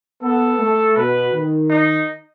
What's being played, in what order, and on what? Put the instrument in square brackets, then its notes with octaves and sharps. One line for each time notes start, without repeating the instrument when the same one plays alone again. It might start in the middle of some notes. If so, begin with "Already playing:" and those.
[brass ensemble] B3 [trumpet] A4
[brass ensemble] A3
[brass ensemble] B2 [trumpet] B4
[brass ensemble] D#3
[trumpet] D#4